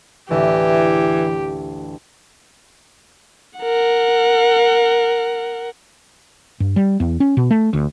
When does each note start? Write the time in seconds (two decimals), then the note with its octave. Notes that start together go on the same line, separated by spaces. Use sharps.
0.31 A1 D2 E3 G4 E5
3.59 A#4 F#5
6.60 G2
6.76 G3
7.00 E2
7.20 C#4
7.37 B2
7.51 A3
7.73 D2